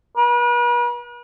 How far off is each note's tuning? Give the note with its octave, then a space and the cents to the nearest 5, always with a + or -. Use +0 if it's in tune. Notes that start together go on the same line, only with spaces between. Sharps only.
B4 -40